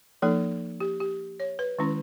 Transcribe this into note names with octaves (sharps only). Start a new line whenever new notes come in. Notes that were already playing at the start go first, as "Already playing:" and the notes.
F3 A#3 D#4 A4
G4
G4
C#5
B4
D#3 G#3 C#4 E4